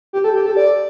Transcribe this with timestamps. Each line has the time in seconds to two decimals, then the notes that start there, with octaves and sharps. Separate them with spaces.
0.13 G4
0.24 A4
0.35 G4
0.46 A4
0.57 D5